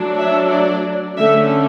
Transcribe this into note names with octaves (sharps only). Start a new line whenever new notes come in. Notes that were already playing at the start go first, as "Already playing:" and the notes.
Already playing: F#3 A3 D4
E5
D5
D3 A3 C#4 E5